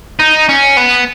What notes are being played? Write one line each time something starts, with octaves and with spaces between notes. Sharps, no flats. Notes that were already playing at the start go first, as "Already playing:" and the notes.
D#4
C#4
B3